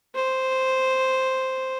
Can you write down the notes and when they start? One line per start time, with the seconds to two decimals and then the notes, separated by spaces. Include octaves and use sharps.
0.15 C5